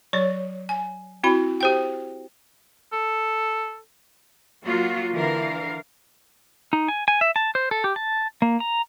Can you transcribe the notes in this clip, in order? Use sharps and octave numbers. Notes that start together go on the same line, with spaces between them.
F#3 C#5 D5
G#5
C4 E4 F#4 B5
G4 C5 G5
A4
F#3 A#3 F4 F#4
D3 E3 A#4 F5
D#4
G#5
G#5
E5
A5
C5
A4
G4
A5
A#3
A#5